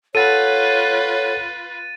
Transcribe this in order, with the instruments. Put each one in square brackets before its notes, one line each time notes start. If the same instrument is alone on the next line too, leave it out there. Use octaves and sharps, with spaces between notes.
[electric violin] F4 B4 [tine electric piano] A4 F#5 [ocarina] C#5 [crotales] A6 D#7